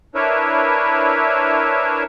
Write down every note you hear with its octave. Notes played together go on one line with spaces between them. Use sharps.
D4 E4 A#4 B4 C#5 E5